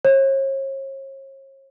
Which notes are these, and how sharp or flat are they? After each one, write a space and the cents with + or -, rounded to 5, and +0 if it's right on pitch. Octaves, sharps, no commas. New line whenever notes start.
C#5 -40